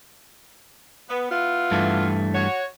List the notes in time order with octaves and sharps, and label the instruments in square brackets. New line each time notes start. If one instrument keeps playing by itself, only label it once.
[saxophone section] B3
B3 E4 F4
[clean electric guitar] G2 E3 A3
[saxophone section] F#4 C#5